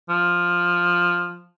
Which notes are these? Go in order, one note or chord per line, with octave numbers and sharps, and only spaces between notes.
F3